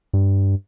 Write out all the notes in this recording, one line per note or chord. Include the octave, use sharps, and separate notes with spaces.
G2